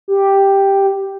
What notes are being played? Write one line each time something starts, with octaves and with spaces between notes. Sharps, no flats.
G4